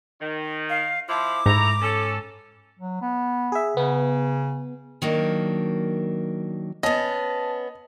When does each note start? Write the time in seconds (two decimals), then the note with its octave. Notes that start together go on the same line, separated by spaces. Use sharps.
0.20 D#3
0.70 F5
1.09 F3 E4 D6
1.46 G#2 A3 E4 A#5
1.81 C#4 A4
2.79 F#3
3.01 B3
3.52 G#4 E5
3.77 C#3 B3
5.02 D#3 F#3 A#3 D4
6.83 B3 C#4 D#5 A5